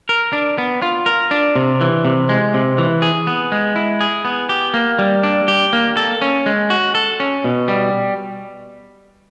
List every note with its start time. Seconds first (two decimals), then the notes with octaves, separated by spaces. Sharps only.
0.09 A#4
0.33 D4
0.58 B3
0.82 F4
1.06 A#4
1.31 D4
1.56 C3
1.81 E3
2.05 C3
2.29 G#3
2.54 C3
2.78 E3
3.02 G#4
3.27 B3
3.52 G#3
3.76 E4
4.01 G#4
4.25 B3
4.49 G4
4.74 A#3
4.99 G3
5.23 D4
5.48 G4
5.73 A#3
5.97 A4
6.22 C#4
6.46 G#3
6.70 F#4
6.95 A4
7.20 C#4
7.44 B2
7.68 G3